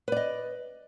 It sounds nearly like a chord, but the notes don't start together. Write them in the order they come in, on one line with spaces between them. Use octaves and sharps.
B4 D5 D#5